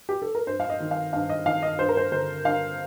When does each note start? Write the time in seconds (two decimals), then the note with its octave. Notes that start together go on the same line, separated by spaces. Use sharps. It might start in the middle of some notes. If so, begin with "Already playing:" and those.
0.09 G4
0.22 A4
0.35 A#4
0.47 G2 C5
0.60 F5
0.70 D#5
0.80 D#3
0.91 F5
1.13 G2 F5
1.29 D#5
1.46 D#3 F5
1.63 D#5
1.79 G2 C5
1.89 A#4
1.97 C5
2.12 D3 C5
2.45 G2 F5